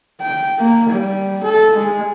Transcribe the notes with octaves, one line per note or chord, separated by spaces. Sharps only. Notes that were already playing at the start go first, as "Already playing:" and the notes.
G5
A#3
G3
A4
G#3